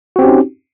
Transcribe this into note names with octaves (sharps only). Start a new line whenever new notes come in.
C4 C#4 D#4 F#4 G4